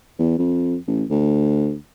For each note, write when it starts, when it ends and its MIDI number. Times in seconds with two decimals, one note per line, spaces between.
0.19 0.35 40
0.38 0.76 41
0.87 1.03 33
1.10 1.75 38